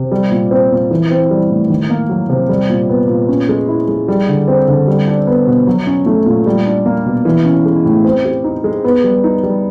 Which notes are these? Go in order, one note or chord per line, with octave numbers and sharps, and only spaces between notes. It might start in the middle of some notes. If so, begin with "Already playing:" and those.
Already playing: C3
G3
A#2
C4
A#2
E3
C4
G3
A2
D#3
A#3
F#3
C3
G3
A#2
B3
A#2
C#4
G#3
E4
G#3
G3
D3
C4
D3
G3
D4
B3
B2
F#3
C#4
A3
A#2
G3
D4
A#3
B2
E3
C#4
G#3
A2
C4
G4
D#4
G#3
B3
G3
D#4
G3